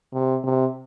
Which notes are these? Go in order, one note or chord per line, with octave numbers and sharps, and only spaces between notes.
C3
C3